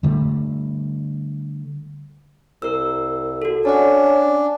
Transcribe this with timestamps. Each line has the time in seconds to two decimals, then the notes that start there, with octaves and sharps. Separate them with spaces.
0.03 D3 G3 A3
2.62 C2 A#4 E6
3.42 F#4 A4
3.65 C#4 D4 F#5 G#5 A5